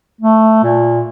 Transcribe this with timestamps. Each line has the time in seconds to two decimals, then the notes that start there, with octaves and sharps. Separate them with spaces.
0.21 A3
0.63 A#2